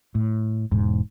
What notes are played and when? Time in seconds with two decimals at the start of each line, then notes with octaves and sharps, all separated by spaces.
0.15 A2
0.72 E1 G#2